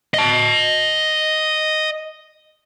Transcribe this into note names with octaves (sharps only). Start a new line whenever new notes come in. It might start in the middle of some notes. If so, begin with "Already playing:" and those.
D#5 A5